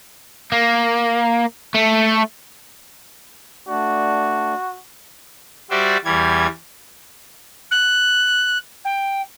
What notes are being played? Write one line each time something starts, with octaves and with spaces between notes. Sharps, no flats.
A#3
A3
A3 D4 F#4 D5
G3 F#4 C5 D5 E5
E2 E3 G3 G#6
F#6
G5